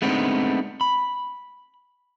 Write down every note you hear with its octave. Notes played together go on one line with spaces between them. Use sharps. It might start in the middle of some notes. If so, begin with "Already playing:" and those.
G#3 A3 B3 C4 D4 D#4
B5